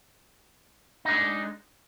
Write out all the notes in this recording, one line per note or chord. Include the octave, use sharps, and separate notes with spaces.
G#3 D4 D#4